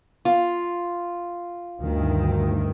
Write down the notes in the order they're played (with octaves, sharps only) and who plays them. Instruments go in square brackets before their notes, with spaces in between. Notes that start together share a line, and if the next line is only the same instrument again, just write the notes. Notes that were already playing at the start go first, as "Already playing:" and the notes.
[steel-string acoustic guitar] F4
[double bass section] D2 G2 D#3